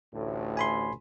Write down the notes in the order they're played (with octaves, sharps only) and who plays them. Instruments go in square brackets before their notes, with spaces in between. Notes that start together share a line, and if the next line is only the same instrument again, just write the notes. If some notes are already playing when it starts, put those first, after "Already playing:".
[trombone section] A1 D2 A2
[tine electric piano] G#5 B5 C6